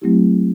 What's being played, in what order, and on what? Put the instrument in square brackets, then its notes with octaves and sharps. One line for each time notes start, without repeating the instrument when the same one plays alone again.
[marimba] F#3 A3 C4 E4 G4